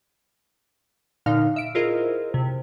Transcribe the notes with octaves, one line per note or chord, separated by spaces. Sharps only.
A#2 D3 D#4 F5 F6
E5 D7
E4 F4 G#4 A#4 C5 D#5
C3